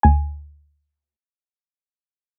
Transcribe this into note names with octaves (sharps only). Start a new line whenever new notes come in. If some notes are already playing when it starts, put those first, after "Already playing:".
D2 G#5